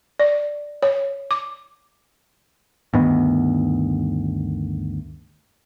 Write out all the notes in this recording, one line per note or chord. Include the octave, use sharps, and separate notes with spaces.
D5
C#5
D6
D2 G2 D#3 B3